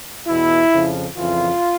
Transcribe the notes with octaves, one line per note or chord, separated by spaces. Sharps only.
E2 B2 E4
F2 C#3 F3
F2 C#3 E3 F4